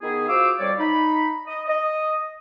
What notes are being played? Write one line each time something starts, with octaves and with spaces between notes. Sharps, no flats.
D#3 B3 E4 G#4
F4 F#4 C5 F5 D6 E6
F2 G3 C#5 D5
D#4 B5
D#5
D#5